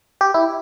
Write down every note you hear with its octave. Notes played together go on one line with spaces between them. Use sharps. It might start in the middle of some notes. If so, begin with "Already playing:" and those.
G4
E4